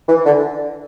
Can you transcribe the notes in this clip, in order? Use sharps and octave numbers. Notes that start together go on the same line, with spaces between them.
E3
D3